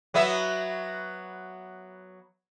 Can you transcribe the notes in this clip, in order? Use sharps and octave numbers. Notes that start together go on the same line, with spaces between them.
F#3 B3 E5